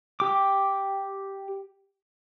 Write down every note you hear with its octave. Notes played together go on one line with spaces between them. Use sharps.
G4 D6